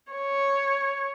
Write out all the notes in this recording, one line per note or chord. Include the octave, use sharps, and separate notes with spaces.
C#5